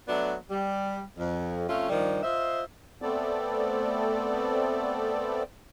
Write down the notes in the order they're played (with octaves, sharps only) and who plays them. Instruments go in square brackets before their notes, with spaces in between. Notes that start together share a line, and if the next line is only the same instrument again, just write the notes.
[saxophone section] F#3 A3 B3 D4 F#4
G3
F2
F2 A3 C#4 F4
G2 D#3 F3 G3
F4 C5 D#5 E5
[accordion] A3 B3 C4 A4 D5